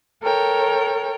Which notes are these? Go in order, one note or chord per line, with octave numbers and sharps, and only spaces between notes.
A4 A#4 C#5 G5